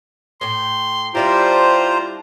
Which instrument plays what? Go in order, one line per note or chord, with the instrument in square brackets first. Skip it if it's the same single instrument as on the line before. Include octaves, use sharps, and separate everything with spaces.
[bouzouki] A2 G5 [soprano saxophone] C6
[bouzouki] G3 D4 E4 [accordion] F4 C5 A#5 [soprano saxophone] G4